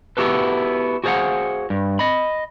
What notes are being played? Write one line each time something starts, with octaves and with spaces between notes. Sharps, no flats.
B3 E4 F#4 G4 A4 B4
F#4 G#4 C5 D5 F5 F#5
G2
D#5 B5